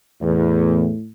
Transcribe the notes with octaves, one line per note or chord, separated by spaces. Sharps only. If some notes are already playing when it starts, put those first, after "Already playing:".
E2 A2